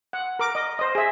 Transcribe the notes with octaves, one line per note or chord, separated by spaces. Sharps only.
F#5
A#4 D6
D#5
C5 D#5
G#4 E5